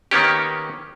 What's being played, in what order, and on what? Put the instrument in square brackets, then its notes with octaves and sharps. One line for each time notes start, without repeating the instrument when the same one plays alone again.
[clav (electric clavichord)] D#3 A#3 B3 C#4 G4